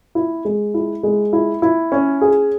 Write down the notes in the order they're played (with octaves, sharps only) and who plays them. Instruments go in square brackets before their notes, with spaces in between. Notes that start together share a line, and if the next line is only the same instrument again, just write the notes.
[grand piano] E4
G#3
E4
G#3
E4
E4
C#4
G#4